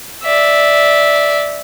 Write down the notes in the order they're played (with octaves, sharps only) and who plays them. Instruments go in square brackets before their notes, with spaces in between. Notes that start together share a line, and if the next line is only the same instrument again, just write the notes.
[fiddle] D5 E5